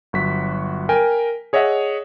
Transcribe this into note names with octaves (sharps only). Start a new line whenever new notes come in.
G1 F#3 F#4 B6
A#4 G5 G#5
G#4 C#5 D#5 E5 F#5